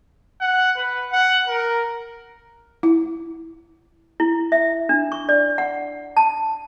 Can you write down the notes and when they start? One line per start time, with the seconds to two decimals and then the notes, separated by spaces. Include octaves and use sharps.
0.41 F#5
0.77 B4
1.12 F#5
1.48 A#4
2.83 E4
4.20 E4
4.52 E5
4.89 D4
5.12 C#6
5.29 D5
5.58 F#5
6.17 A5